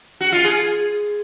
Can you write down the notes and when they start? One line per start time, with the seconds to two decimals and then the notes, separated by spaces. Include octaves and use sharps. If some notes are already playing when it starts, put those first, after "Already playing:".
0.21 F#4
0.32 F4
0.44 G#4